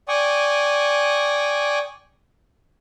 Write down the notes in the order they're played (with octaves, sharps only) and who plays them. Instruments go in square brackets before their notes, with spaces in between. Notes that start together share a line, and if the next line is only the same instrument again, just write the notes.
[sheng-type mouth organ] D5 G5 G#5 C#6 D#6